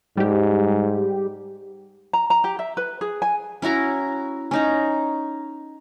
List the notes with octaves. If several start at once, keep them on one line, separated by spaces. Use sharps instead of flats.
G#2 G3 G4
A#5
A#5
G4
E5
B4
G#4
G#5
C#4 E4 F#4 A#5
C#4 D#4 A#5